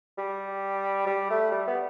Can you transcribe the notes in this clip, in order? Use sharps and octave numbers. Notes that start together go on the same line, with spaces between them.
G3
G3
A3
G3
B3